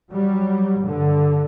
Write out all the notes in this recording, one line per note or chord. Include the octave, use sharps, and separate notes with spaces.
F#3 G3
G2 D3